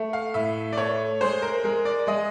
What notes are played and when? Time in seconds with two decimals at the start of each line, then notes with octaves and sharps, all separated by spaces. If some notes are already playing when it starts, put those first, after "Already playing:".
Already playing: A3
0.13 F5
0.34 A2 E5
0.73 D5
0.77 A3 C#5
1.21 G#3 C5
1.42 A#4
1.64 G#3 A#4
1.85 D5
2.07 G#3 D#5